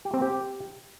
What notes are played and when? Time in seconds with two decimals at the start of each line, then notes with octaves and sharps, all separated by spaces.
0.05 G4
0.14 C4
0.22 G4